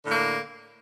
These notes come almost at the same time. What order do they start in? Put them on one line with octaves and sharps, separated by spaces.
D3 A2 A#3